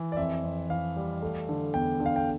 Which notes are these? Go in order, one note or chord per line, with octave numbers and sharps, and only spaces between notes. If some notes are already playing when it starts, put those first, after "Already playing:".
Already playing: E3
D5
F2 E5
F2
E3 F5
G3
A3
D3
E2 G5
D3
F5
G5